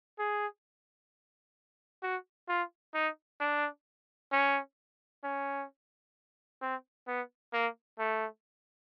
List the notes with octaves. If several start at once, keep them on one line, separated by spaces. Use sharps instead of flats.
G#4
F#4
F4
D#4
D4
C#4
C#4
C4
B3
A#3
A3